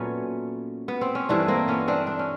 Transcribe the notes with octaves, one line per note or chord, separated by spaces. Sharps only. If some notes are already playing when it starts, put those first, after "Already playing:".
Already playing: A#2 F#3 A3 B3 C#4
B3
C4
C#4
G2 E3 A3 C4 D4
A#3 C4
B3 C#4
C4 D4
D4
C#4